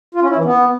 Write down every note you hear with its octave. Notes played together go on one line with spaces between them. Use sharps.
F4
C#4
E4
E3
B3